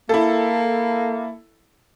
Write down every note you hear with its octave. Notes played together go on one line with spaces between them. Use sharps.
A#3 E4 A4